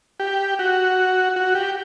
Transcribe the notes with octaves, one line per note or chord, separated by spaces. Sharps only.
G4
F#4
F#4
G4